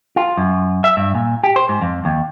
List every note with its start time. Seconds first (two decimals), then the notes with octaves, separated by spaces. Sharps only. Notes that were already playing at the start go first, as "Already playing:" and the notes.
0.16 F4
0.38 F#2
0.84 E5
0.97 G2
1.15 A#2
1.43 G4
1.56 C5
1.69 G#2
1.82 F2
2.05 D#2